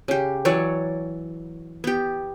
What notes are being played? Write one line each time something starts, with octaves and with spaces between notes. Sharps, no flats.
C#3 G4
E3 F#3 C#5 D5
B3 G4